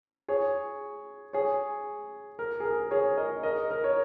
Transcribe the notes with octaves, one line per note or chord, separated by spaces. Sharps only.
G#4 C#5
G#4 C#5
A#4
G#4
A#4
G#4 C#5
A#4 D#5
A#4 D#5
A#4
C#5